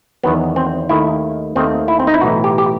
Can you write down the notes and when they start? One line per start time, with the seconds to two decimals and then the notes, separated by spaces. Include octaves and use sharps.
0.24 E2 D#3 F#3 B3
0.56 C4
0.89 D#2 D#3 A3 E4
1.55 D#2 D#3 A3 C4
1.88 E4
2.00 C4
2.07 D#4
2.14 E4
2.21 B1 A2 E3 F#4
2.44 G4
2.58 G4